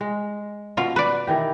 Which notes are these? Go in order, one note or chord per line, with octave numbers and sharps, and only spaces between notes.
G#3
B2 F4
B4 D5
D#3 E3 G4